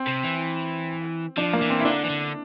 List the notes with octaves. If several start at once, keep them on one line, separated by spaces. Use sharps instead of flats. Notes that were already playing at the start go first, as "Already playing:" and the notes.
Already playing: C4
C3
E3
F3 D4
A#3
E3
C4
E4
D3 D4
E3
D3